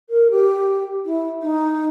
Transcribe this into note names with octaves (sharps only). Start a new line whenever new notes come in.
A#4
G4
E4
D#4